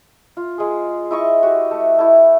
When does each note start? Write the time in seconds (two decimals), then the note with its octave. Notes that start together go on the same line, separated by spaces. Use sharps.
0.37 F4
0.58 G#3 G#4
1.11 E4 D#5 C#6
1.43 F#4 G4
1.71 A3
1.99 A3 E4